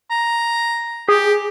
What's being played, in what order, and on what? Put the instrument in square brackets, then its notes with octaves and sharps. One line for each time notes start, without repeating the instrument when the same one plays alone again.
[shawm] A#5
[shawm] G4 [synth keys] G#4